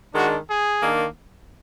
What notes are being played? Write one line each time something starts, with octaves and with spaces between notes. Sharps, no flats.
D#3 G#3 D4 F#4
G#4
D#3 A#3 D4